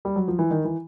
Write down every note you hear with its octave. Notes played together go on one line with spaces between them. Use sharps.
G3
F#3
F3
E3
D#3
E3